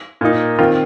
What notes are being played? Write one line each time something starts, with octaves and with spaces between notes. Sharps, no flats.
A#2 A#3 D#4
D#3 C4 F4